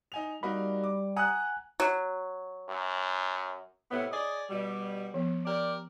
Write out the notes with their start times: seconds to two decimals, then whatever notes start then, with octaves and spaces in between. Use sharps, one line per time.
0.12 D#4 G#5 F7
0.43 G3 A#3 D#4 F#4 B5
0.84 D6
1.17 F#5 G#5 A#5 D#6 F#6
1.80 F#3
2.69 F#2
3.91 A2 C3 B3 C#5
4.12 G#4 D5 D#5
4.50 B2 G3
5.14 F3 B3
5.46 G4 A#4 D5